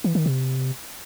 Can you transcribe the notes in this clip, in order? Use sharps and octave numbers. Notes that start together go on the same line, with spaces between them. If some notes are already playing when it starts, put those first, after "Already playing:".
E3
D#3
C3